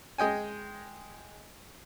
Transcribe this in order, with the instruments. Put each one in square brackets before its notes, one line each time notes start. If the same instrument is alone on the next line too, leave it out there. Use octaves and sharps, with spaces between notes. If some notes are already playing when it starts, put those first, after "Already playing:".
[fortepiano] G#3 D#5 G5 G#5